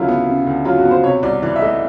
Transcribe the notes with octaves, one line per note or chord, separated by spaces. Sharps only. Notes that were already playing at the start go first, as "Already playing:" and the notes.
Already playing: D2 C#3 F#3 E4 F4 A#4
B3
C#3
D2
F#3 F4
F#4
B3
C5
C3 C#5
C2 D5
E3 D5
E5
A3 D#5